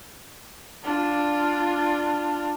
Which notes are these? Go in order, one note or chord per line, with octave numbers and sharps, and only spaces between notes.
D4 F4